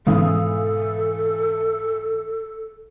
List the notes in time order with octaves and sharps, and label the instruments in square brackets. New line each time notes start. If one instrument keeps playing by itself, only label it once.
[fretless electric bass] G#2 B2 [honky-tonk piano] E3 F5 D#6 [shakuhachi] A4